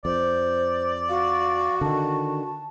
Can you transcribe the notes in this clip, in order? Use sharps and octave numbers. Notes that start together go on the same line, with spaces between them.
F2 C5 D5
F#4 F5
D3 D#3 A5